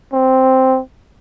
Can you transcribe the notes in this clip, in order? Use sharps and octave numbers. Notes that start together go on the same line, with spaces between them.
C4